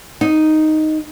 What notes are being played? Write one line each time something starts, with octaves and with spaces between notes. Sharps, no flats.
D#4